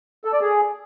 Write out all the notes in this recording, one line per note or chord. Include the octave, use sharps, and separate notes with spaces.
A4
D5
G#4